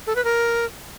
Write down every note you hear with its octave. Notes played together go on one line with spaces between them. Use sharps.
A4
B4
A#4